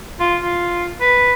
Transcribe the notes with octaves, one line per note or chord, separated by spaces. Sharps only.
F4
F4
B4